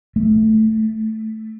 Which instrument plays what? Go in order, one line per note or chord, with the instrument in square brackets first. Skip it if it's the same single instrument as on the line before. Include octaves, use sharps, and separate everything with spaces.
[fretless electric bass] A3